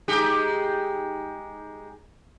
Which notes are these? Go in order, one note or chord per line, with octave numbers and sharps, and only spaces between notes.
G#3 D#4 G4